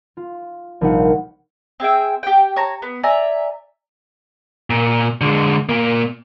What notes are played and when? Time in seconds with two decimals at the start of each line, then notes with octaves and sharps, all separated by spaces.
0.17 F4
0.81 A#1 C3 G3 D#4 F5 F#5
1.80 C4 G#4 E5 G5
2.23 G4 G5
2.56 C#5 A5 A#5
2.82 B3
3.03 D5 E5 G#5 A#5
4.70 A#2
5.21 D3 G#3
5.69 A#2 A#3